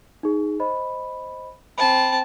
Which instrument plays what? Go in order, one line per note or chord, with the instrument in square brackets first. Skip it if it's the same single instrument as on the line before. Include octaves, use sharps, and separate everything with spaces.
[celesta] D#4 G#4
C5 D#5 B5
[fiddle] C4 A5 [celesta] B5